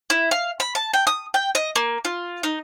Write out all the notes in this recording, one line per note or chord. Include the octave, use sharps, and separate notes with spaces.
E4
F5
B5
A5
G5
D#6
G5
D#5
A#3
F4
D#4